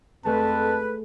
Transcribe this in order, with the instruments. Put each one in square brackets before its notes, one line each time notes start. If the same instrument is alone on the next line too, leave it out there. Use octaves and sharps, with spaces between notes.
[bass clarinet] F2 [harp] G#3 A3 [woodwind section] B4 [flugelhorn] A5